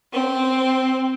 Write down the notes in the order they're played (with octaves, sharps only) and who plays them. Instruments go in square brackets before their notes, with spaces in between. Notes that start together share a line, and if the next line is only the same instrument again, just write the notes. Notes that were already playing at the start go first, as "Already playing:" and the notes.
[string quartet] C4